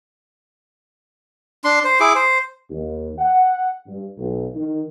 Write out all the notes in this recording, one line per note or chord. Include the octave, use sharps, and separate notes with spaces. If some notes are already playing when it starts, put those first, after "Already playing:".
D4 C6
C5
E4 G#4 D6
C5
D#2
F#5
G2
B1
D#3